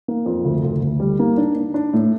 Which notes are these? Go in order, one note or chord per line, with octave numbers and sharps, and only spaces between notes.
A#3
F2
D2
D2
D2
G3
A#3
D4
D4
D4
A2